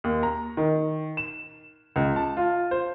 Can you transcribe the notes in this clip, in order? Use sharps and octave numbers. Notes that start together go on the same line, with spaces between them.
D#2
A#5
D#3
E7
C#2
A5
F4
C5